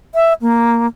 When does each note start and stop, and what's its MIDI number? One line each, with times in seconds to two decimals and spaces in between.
0.15 0.33 76
0.41 0.87 58